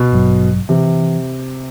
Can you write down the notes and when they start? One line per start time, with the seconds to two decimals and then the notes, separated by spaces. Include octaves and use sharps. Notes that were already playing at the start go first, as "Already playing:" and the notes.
Already playing: B2
0.12 A1 G2 F#3
0.69 C3 E3